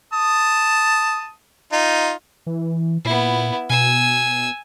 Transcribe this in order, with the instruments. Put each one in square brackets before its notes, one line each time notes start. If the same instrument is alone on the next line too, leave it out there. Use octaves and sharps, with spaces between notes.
[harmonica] A5 D#6
D#4 F4
[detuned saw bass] E3
[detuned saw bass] A#2 [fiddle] B3 E4
[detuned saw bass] B2 [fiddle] G#5 E6